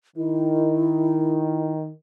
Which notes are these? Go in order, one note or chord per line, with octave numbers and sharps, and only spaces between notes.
D#3 E4